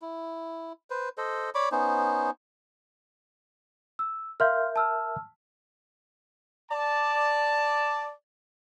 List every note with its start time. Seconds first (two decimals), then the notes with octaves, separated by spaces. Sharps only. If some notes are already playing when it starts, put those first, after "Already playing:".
0.02 E4
0.90 B4 C5
1.18 A4 C5 D#5
1.55 C#5 D5 B5 D6
1.72 B3 C#4 D#4 C5
3.99 E6
4.40 A#4 E5 F5 C6 F6 G6
4.76 A5 E6 F6
6.70 D5 A5